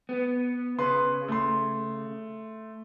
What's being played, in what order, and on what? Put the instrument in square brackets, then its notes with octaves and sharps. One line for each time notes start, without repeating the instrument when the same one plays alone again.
[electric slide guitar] B3
[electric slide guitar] C#3 [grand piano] B4 C6
[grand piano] A3 C6